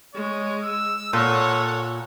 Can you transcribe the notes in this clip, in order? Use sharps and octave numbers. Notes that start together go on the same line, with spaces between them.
G#3 C#5
E6
A#2 A4 C#5 F#5